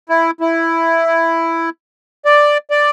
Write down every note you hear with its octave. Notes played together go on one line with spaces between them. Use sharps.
E4
E4
D5
D5